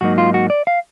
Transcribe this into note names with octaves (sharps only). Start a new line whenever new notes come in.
G#2 F#3 A#3 D#4 F#4
F4
F#4
D5
F5